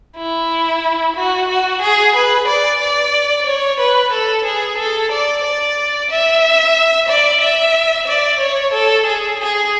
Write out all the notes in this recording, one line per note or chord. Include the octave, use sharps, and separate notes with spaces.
E4
F#4
F#4
G#4
B4
D5
D5
C#5
B4
A4
G#4
A4
D5
D5
E5
D5
E5
D5
C#5
A4
G#4
G#4